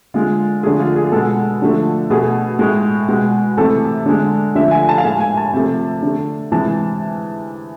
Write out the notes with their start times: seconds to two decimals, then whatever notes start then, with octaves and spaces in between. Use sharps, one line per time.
0.14 D3 G#3 F4
0.63 D3 F3 A3 G#4
0.80 F4
0.96 G#4
1.12 B2 G#3 A4
1.62 D3 F3 A3
2.10 B2 A3 G#4
2.59 A2 G#3
3.09 B2 G#3
3.57 C3 E3 A3 A4
4.06 D3 G#3
4.55 D3 F3 A3 E5
4.71 G#5
4.89 A5
4.98 F5
5.04 A2 G#3 G#5
5.20 G#5
5.37 A5
5.54 C3 F3 A3
6.02 D3 A3
6.52 C3 E3 G#3 A5